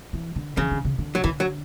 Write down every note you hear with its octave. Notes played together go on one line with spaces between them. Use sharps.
E3
D3
C#3 E3
D3
C#3
D3
F#3
D3 E3
F#3